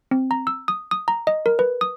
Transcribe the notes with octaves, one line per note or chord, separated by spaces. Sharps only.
C4
A#5
E6
D#6
D#6
A#5
D#5
A#4
B4
D#6